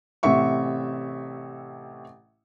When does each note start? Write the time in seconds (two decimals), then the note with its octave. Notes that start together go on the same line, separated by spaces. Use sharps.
0.23 A1 C3 E5 C#6